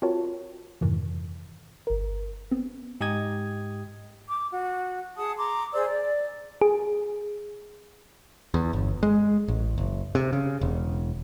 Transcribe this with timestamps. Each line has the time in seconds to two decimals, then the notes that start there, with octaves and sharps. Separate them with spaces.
0.02 C4 F4 F#4 A#4 C#5 A5
0.81 F2 G#2 C3 D#3 E3
1.87 G1 A#4
2.51 B3 C4
3.01 G#2 G4 D#5 D#6 G#6
4.30 D6
4.53 F#4
5.17 G#4 F#5 A5 D#6
5.38 A#5 C6 D6
5.74 G#4 C5 D5 E6
5.86 D5
6.61 G#4
8.54 E2
8.73 G1
9.03 G#3
9.48 A1
9.78 F#1
10.15 C3
10.33 C#3
10.61 E1